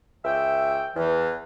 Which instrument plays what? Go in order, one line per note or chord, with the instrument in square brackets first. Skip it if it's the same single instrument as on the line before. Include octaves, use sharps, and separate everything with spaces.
[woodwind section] C#2 E5 G5
E2 E3